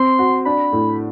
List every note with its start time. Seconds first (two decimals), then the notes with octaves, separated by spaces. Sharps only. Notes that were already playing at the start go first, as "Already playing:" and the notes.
Already playing: C4 C6
0.19 F#4
0.45 D4 B5
0.72 A2